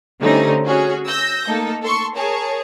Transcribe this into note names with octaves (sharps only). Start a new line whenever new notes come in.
D3 G3 A3 C4 C#4 D#4
C#4 F#4 G#4 C#5
E6 G6 A#6
A3 A#3 D#4 A4
A4 C6 C#6
G#4 A#4 C#5 A5